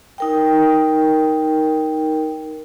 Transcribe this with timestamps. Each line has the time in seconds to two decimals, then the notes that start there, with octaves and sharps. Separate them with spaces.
0.18 D#4 A#4 G5